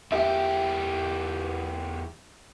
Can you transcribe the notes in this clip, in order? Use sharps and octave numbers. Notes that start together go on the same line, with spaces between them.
E2 G4 E5